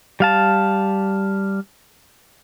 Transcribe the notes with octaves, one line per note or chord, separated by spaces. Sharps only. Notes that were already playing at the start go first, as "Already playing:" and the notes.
G3 F5 A5